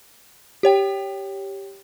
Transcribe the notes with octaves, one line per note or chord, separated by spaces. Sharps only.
G4 C#5 G5